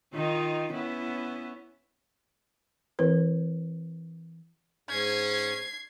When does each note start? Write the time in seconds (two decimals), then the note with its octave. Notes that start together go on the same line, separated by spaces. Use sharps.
0.14 D#3 D#4 F4
0.73 B3 C#4 E4
2.99 E3 C4 E4 A#4 B4
4.89 G#2 C#4 G#6 C7